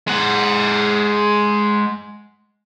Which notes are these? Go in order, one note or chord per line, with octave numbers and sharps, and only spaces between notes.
G#3 F#5